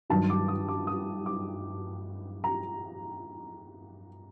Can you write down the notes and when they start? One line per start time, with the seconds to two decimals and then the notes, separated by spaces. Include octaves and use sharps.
0.10 G2 D#3 F#3 A5
0.30 D6
0.48 D#6
0.68 D6
0.87 D#6
1.26 D6
2.44 A#5